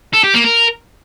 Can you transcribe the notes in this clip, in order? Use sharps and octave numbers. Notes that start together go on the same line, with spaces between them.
A4
G4
A#3
A#4